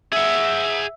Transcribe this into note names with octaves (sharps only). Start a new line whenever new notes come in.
G#4 E5 F#5